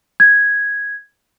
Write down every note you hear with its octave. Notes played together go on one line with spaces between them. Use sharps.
G#6